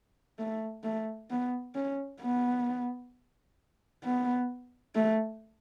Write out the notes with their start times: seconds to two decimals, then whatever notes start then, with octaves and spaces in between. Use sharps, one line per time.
0.39 A3
0.84 A3
1.30 B3
1.75 C#4
2.21 B3
4.04 B3
4.95 A3